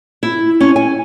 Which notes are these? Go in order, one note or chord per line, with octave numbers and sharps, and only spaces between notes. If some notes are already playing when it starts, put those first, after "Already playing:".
E4
C#4
G#5